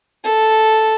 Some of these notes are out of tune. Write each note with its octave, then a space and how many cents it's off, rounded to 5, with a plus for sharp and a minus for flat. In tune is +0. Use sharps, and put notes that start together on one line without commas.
A4 -5